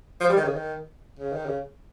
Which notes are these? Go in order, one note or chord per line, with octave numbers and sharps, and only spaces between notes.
F3
G3
D#3
C#3
D#3
C#3
D#3
C#3